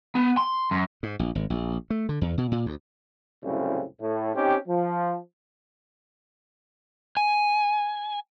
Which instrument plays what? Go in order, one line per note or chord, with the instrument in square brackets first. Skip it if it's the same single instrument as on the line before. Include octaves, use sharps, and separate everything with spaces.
[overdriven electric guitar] B3
C6
F#2
[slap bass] G#2
A#1
G#1
A#1
A3
D3
E2
B2
A#2
D2
[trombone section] C2 F#2 A2 C#3 C4
A2
C4 C#4 D#4 G4
F3
[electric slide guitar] G#5